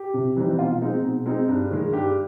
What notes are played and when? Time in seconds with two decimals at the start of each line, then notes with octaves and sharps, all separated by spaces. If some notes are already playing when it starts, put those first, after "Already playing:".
Already playing: G4
0.14 C3
0.36 E3 G3 C4 D#4
0.58 B2 F4
0.81 G#3 C4 D#4
1.04 B2
1.26 G#3 C4 D#4
1.48 G2
1.71 D#3 G#3
1.92 G2 G4